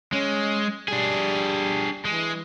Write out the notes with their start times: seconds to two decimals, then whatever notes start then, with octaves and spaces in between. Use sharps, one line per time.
0.13 G#3 C#4
0.88 G3 D4 G#4
2.05 E3 G#3